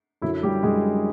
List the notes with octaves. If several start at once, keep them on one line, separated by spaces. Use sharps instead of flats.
F#2 D3 F#3 E4
G3 G4
F#2 D3 F#3 G#3 G#4